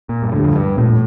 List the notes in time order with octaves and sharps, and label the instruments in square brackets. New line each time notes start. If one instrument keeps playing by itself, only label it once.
[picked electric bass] A#2
G2
[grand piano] D2 D3 G3 [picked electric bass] A2
[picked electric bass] F2
G2
[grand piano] A#1 [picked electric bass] A2